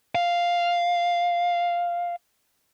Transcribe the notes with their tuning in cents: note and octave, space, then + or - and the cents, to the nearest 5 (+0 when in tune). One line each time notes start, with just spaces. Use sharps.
F5 +0